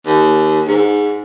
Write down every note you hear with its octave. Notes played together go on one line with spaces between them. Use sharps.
D#2
G#2